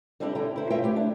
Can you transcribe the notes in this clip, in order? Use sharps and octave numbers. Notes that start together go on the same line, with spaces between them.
G3 C4 D4 E4 G4
D3 E4 G5 A#5
E4 C5
C4 F4 C#5 D#5 E5 G5
A3 E4 G4
D4